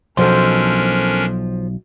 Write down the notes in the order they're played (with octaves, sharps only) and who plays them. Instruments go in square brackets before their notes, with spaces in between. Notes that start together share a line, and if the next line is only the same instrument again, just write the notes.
[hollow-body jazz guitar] B1 [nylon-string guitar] F3 [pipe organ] C#4 D4 A#4 [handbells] A4 C5 C6